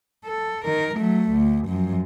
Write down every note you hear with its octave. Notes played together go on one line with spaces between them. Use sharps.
A4
D#3 A#4
F#3 A3
D2
F#2 F3